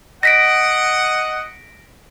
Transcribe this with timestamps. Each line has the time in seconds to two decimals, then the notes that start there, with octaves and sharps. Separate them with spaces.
0.23 D#5 F#5 A#6 B6 D7